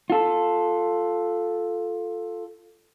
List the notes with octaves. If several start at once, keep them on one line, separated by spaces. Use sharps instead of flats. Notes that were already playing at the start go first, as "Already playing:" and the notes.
F4 A4